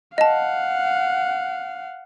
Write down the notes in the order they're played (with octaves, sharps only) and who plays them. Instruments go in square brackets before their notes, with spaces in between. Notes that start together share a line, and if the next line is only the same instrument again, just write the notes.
[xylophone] D#5 A5 [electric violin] F5 F#5